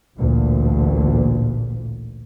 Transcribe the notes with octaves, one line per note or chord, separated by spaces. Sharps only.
A1 D2 A#2